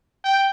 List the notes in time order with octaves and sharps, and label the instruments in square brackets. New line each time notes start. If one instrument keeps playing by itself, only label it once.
[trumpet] G5